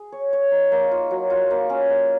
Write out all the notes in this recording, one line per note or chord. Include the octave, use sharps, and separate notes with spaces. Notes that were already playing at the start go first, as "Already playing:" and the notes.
Already playing: G#4
C#5
C#5
D#4
A#3
F4
F#3
F4
A#3
C#4
A#3